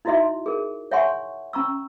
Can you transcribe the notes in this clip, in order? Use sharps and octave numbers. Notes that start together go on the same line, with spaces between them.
D#4 E4 F#4 D#5 E5 C6
G#4 A#4
C#5 E5 F#5 G#5 C6 C#6
C#4 A#5 C#6 E6